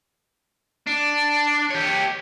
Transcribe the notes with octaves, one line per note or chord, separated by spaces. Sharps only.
D4
G4 C#5